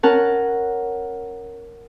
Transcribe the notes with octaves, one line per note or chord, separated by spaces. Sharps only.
C#4 A#4 F#5 A5